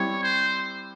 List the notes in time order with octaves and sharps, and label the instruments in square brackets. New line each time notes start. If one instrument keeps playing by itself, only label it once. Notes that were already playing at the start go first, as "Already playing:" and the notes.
Already playing: [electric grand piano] G3 C4 E4 G4 [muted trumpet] C#5
[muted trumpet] C5